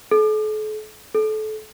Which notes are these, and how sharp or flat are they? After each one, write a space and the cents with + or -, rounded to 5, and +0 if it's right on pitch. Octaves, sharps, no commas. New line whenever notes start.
A4 -45
A4 -30